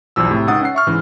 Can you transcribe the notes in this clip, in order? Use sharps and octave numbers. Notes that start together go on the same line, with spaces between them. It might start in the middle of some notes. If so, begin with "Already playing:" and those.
B1 E2 F3 E6
A2 C3
C#2 D#4 F#5 D#6 A6
C#4 F#5 C7
E5 C#6 F6
G#2 C#3 E3